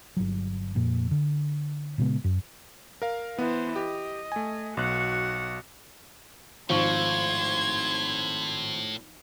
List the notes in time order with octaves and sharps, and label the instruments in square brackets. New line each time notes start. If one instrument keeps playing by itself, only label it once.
[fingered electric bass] G1 F#3
F2 A#2
D3
A#2 C#3 G#3 B3
F#2
[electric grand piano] A#4 F5
[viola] E3 C5 [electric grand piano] B3
[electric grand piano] G4 [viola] D#5
[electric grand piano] A3 G#5
[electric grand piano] B1 F#6 [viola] F#4 F#5
[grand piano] G#1 C#6 [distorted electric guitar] A2 [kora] F3 [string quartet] C6 G#6